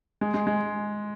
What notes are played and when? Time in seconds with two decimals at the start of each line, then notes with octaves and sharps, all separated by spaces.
0.21 G#3
0.34 G#3
0.47 G#3